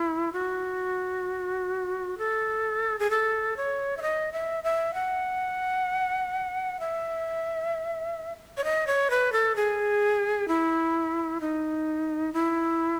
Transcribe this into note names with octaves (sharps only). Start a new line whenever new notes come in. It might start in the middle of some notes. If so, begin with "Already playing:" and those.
Already playing: E4
F#4
A4
G#4
A4
C#5
E5
D#5
E5
E5
F#5
E5
C#5
D#5
C#5
B4
A4
G#4
E4
D#4
E4